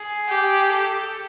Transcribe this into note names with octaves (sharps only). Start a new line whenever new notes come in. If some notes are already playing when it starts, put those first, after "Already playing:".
Already playing: G#4
G4
A4